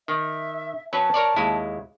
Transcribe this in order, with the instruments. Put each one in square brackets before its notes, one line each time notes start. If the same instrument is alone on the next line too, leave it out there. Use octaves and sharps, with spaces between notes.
[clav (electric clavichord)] D#3 [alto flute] E5
[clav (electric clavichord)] F#3 C#4 B4 [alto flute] A5
[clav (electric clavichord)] A#4 C#5 D5
D#2 G#3 E4